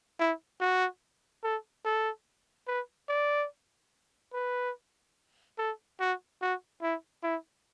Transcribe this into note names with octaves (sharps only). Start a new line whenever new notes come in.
E4
F#4
A4
A4
B4
D5
B4
A4
F#4
F#4
E4
E4